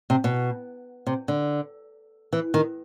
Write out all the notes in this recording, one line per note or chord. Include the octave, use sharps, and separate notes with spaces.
C3
B2
C3
D3
E3
D#3